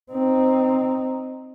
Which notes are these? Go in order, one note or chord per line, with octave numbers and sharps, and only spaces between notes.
C4 D#4